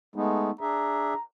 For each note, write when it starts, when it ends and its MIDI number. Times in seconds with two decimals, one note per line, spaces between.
0.16 0.50 56
0.16 0.51 57
0.16 0.51 59
0.16 0.51 63
0.61 1.14 62
0.61 1.14 68
0.61 1.14 76
0.61 1.22 82